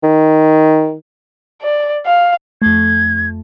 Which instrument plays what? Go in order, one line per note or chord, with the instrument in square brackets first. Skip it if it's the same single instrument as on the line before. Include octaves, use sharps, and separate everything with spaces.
[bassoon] D#3
[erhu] D5
F5
[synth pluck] F2 A3 [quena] G#6